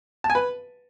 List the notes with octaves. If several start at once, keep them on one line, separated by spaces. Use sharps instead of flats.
A5
G#5
B4